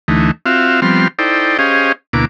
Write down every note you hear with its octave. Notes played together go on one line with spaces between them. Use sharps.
D2 E3 A3 D#4
C4 F4 F#4 E5 F5
F3 G3 B3 C4 C6 F6
D#4 E4 A4 C5 D5 G5
C#4 G4 G#4 C5 D#5 F5
D2 B2 A#3 E4 D6